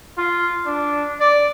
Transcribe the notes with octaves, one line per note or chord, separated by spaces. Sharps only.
F4
D4
D5